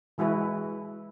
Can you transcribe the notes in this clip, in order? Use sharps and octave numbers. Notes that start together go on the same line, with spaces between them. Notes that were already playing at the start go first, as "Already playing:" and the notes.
E3 G#3 E4 F#4 B4